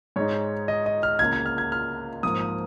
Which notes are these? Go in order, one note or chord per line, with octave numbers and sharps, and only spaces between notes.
G#2 G#3 D#4 C#5
D#5
D#5
F6
C#2 C#3 A#3 G#6
G#6
F6
G#6
F6
G#2 F3 A#3 D#6
D#6